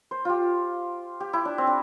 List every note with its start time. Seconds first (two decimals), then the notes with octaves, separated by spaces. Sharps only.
0.11 C5
0.25 F4 G4
1.20 G4
1.33 E4
1.45 D4
1.58 C4
1.67 D4